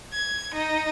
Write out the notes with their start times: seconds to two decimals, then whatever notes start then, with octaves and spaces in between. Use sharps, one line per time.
0.13 G#6
0.55 D#4